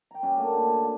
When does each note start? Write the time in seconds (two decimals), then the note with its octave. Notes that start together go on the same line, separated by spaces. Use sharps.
0.11 G5 A#5
0.23 G3 C#4 F#4 G4
0.37 A3 A#3 D4
0.53 D3
0.67 G#5
0.83 A4 F#5